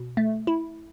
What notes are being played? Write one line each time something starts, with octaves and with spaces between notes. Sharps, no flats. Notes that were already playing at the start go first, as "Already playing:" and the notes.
Already playing: B2
A3
E4